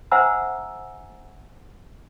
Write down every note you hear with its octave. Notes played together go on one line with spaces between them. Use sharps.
C5 E5 F#5 G#5 A#5 E6